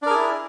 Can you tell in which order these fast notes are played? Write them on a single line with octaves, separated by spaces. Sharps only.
D4 A#4 G#4 E4